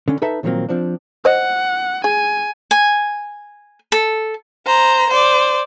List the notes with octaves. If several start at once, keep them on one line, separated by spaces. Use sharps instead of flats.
D3 C#4
D#4 A4 B4 E5 A5
A#2 D#3 F3 F#3 A#3 C4
F3 C4 D4
C5 D#5 F#5
G#4 G#5
G#5
A4
C5 A#5
C5 D5